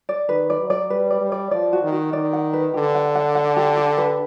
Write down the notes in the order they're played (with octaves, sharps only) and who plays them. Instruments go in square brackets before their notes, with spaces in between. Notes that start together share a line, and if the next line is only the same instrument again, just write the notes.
[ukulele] D5
[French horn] D#3 [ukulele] B4
[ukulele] D5
[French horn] F#3
[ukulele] D5
[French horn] G3 [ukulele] B4
[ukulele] D5
[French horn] G3
[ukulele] D5
[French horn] F3 [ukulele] D5
[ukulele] F#4
[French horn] D#3
[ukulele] F#4
[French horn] D#3 [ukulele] D5
[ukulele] F#5
B4
[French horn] D3 [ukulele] G4
[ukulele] F#5
F#5
F#5
G4
G4
B4